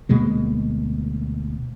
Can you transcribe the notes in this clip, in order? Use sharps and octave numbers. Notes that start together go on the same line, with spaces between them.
D2 B2 G#3 A#3